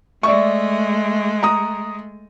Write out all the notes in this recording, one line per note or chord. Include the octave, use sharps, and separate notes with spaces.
G#3 A3 D5 E5 C#6
A#5 D#6